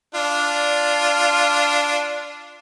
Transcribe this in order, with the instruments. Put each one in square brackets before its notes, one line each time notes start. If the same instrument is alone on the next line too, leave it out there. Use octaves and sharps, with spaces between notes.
[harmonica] D4 F4